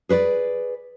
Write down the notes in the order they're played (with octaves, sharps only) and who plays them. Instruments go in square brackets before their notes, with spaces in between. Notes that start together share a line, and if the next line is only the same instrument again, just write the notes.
[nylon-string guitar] G#4 B4 C5 D5